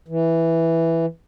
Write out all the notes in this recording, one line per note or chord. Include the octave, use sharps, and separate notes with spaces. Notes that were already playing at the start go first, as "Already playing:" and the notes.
E3